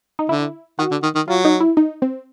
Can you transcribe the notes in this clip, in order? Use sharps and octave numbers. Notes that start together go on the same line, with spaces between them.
D#4
D3 E4
D#3 F#4
D3
D#3
D#3
F#3 F4
D#4
E4
D#4
C4